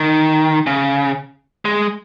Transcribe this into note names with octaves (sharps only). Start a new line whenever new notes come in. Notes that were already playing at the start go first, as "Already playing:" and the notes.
Already playing: D#3
C#3
G#3